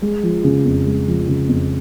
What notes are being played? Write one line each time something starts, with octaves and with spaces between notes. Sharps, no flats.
G#3
F3
C#3
F2
G#3
F3
C#3
F2